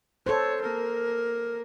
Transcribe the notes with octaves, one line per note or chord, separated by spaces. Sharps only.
A4 C5 C#5
A#3 A#4